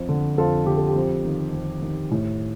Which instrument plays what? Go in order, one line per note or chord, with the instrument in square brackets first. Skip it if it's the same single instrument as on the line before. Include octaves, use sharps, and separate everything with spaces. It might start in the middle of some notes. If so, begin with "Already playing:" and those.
Already playing: [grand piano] F2
D3
F2 F4 A4
D3 G4
A4
G4
F2
D#3
F2
D#3
A2